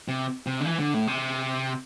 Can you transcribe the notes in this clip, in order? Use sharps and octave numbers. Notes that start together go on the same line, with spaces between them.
C3
C3
D3
E3
D3
A2
C3